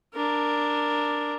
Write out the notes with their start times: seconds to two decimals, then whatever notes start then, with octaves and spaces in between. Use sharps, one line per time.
0.14 D4 A#4